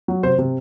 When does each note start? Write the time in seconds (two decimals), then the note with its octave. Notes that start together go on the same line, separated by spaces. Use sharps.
0.08 F#3
0.23 C3 C5
0.38 C3